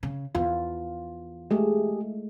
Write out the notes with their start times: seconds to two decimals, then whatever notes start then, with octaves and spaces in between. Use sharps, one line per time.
0.03 C#3
0.35 E2 F4
1.51 G#3 A3 G4 G#4